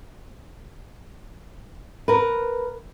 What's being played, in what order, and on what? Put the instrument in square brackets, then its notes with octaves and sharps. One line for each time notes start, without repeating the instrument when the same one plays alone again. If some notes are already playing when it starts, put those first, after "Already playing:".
[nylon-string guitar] A#4 B4